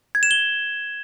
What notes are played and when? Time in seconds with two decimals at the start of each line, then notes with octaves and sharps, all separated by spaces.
0.15 G#6
0.23 E7
0.31 G7